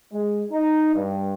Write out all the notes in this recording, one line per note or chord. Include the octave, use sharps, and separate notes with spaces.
G#3
D#4
G2